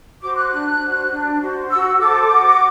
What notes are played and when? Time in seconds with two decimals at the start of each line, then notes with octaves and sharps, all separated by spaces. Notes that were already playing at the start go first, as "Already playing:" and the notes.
0.21 F#4 C5 D6
0.37 F#6
0.51 D4
0.81 F#4 C5
1.11 D4
1.41 F#4 C5
1.71 F#4 E6
2.00 A4 C5 D6
2.31 F#4